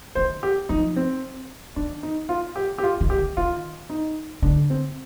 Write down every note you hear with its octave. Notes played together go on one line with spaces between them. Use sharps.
D#3 C5
G4
F3 D#4
C4
D#3 D4
D#4
F4
G4
G4
F4
D#3
G4
D#3
D#3 F4
D#4
D3 D4
C4